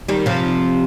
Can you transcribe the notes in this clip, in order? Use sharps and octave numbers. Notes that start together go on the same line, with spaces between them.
D#3 G3
C3 F3